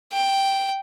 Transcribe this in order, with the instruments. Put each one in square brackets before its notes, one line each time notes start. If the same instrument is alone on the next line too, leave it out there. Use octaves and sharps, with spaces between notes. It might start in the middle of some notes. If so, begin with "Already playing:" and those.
[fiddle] G5